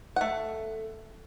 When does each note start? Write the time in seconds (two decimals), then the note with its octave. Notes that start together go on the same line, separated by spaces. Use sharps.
0.16 A3 F#5